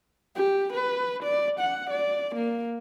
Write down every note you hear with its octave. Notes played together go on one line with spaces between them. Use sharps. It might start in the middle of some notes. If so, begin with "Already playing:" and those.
G4
B4
D5
F#5
D5
A#3